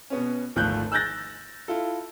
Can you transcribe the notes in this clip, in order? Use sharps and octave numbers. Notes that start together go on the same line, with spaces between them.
B2 B3 C#4
G#1 D2 F3 A3 F#6 G6
E6 F#6 G6 A6 A#6
E4 F4 A4